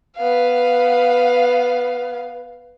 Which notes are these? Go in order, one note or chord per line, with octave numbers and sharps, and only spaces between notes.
B3 F5